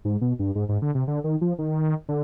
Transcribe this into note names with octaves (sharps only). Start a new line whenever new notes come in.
G#2
B2
G2
G#2
G#2
D3
C3
D3
D#3
F3
D#3
D3